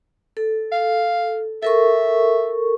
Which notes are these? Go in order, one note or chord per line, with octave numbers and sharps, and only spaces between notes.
A4
F5
A4 A#4 E5 C#6